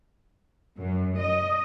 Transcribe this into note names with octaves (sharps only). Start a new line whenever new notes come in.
F#2
D#5